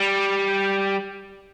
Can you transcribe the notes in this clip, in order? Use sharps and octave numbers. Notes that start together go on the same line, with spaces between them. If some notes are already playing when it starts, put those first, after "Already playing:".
Already playing: G3